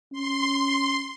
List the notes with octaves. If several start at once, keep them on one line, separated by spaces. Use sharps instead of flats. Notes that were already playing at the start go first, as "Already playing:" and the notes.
C#4 C6